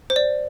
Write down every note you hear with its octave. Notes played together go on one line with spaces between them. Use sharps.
C5
D5